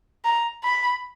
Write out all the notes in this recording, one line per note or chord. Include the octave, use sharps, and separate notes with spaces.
A#5
B5